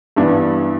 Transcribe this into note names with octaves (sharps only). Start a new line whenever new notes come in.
G2 E3 B3 D4